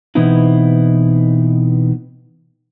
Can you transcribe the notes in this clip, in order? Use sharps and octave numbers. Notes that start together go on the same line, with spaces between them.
B2 E3 B3 C4 D#4 E4